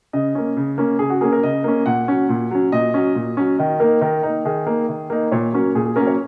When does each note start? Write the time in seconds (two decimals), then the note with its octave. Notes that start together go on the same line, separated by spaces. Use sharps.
0.13 C#3 D#5
0.35 A#3 C#4
0.57 C#3
0.78 A#3 C#4
0.99 C#3 G#4
1.10 F#4
1.21 A#3 C#4 G#4
1.32 A#4
1.43 C#3 D#5
1.64 A#3 C#4
1.86 A#2 F#5
2.08 F#3 C#4
2.29 A#2
2.51 F#3 C#4
2.72 A#2 D#5
2.94 F#3 C#4
3.15 A#2
3.37 F#3 C#4
3.59 D#3 D#5
3.80 A#3 D#4 A#4
4.01 D#3 A#4
4.23 A#3 D#4
4.45 D#3 G#4
4.67 A#3 D#4
4.89 D#3
5.10 A#3 D#4
5.31 A#2 C#5
5.53 F#3 A#3 C#4
5.75 A#2 G#4
5.85 G#4
5.96 F#3 A#3 C#4 A#4
6.07 C#5